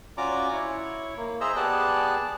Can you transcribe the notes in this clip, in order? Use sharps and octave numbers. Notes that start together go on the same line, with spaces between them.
C#4 F4 F#4 D5 A#5 D6
E4 C#5
A#3
G#4 C5 D#5 E5 A#5 E6
B3 G4 G#4 D5 A5 F#6